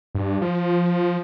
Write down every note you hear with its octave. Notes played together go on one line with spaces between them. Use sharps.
G2
F3